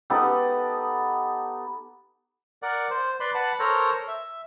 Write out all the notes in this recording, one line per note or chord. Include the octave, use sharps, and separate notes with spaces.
B3 D#4 G4 A4
A#4 D5 F#5
C5
B4 D5 B5 C6
B4 F#5 A5 B5
A4 A#4 C5 C#5 A#5
E5